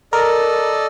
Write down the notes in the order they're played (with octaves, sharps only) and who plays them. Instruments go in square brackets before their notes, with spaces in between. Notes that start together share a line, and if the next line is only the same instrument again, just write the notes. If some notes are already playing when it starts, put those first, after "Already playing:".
[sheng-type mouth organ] A4 D5 D#5 [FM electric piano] A#4